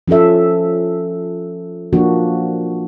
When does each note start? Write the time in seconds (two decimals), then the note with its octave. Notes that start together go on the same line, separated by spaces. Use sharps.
0.08 F3 C#4 F4 A4 E5
1.93 F3 A#3 D4 F#4